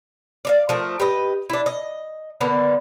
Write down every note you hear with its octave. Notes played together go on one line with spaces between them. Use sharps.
D5 D#5 F5
F3 A3 A#4
G4 B4 D#5
D4 E4
D#5
D3 A#3 B3